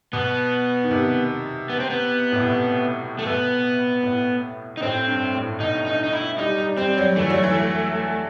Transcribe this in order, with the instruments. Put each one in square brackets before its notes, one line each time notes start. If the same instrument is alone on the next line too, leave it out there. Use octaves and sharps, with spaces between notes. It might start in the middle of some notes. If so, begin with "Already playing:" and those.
[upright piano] B2 [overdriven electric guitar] B3
[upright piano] D#3
C3
[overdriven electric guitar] B3
C4
B3
[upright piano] A2
B2
C3
[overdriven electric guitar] A3
[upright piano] B2 [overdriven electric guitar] B3
[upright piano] A2
[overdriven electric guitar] D#4
[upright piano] A2 [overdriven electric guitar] C4
[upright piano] G2
A2
[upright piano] B2 [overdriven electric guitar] D#4
[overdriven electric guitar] D#4
D#4
E4
[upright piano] G3 [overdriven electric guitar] D#4
[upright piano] G3
[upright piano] G3 [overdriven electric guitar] C4
[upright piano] F#3
[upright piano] E3 [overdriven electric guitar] A3
[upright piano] F#3
E3